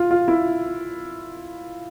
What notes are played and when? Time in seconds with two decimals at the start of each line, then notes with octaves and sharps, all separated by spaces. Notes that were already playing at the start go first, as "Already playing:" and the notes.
Already playing: F4
0.11 F4
0.28 E4